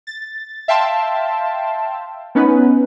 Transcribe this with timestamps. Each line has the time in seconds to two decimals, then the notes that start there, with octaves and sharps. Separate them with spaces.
0.07 A6
0.68 E5 F5 G5 A5 C6
2.35 B3 C#4 D#4 B4